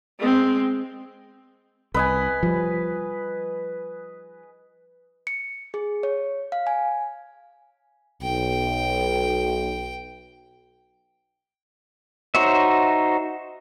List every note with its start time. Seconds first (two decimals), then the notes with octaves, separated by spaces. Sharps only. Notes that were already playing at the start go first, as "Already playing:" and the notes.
0.20 G#3 C4
1.94 C2 B4 D#5 G#5
2.43 F3 G3
5.27 C#7
5.74 G#4
6.03 C#5
6.52 F5
6.67 G#5
8.22 B1 G5
12.35 D#4 F#4 C5 C#5 E5